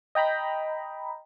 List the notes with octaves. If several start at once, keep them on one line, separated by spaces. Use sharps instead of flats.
D#5 G5 A#5 B5